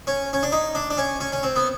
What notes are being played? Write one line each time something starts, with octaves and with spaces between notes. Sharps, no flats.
C#4
C#4
D4
D#4
D4
D4
C#4
C#4
C#4
C4
B3